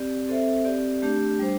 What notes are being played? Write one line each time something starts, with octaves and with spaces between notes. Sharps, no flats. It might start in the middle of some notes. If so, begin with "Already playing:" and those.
Already playing: C4 G4 D5
C4 A4 C5 E5
C4 G4 D5
A3 D4 G4
G3 D4 C5